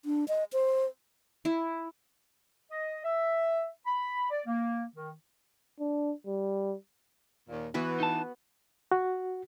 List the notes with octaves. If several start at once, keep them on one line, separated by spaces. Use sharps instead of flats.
D4
D#5
C5
E4
D#5
E5
B5
D5
A#3
D#3
D4
G3
D#2 A#2
E3 B3 F#4 B4
D#4 A5
F#4